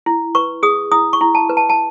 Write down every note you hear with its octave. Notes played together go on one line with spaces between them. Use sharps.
E4
B4 C#6
G#4 D#6
E4 D#6
C#6
E4
A5
B4
A5
A5